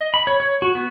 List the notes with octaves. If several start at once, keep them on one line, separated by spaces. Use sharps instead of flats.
D#5
B5
C#5
C#5
F#4
B3